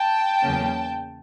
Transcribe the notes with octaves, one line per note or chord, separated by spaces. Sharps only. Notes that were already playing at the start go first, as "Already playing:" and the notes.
Already playing: G5 A5
E2 C#3 F#3 A#3 C#4